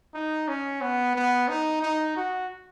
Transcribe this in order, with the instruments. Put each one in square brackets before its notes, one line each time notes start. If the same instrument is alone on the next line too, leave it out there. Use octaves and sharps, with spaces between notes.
[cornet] D#4
C#4
B3
B3
D#4
D#4
F#4